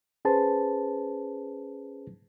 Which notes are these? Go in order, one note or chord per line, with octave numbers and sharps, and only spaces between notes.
C#4 G#4 B4 C5 A5